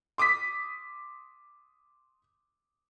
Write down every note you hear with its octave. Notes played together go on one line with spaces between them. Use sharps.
C6 D6 D#6 B6